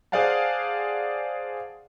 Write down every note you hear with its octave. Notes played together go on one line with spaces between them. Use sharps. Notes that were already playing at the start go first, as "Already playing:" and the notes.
G#4 C5 D5 F5 F#5 A5